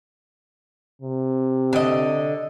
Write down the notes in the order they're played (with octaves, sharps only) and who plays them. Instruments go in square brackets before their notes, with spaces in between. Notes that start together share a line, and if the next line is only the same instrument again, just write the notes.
[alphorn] C3
[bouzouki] D3 D#5